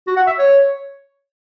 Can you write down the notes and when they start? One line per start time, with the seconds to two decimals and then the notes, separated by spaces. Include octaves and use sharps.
0.07 F#4
0.17 F#5
0.27 E5
0.39 C#5